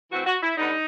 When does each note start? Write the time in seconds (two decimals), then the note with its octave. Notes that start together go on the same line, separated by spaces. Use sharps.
0.12 E3 A3 C4 F#4
0.26 F#4
0.43 E4
0.57 D3 G3 B3 D#4